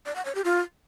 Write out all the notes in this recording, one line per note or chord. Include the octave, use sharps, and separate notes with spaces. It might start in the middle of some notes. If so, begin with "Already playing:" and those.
D5
F#5
C#5
G4
F4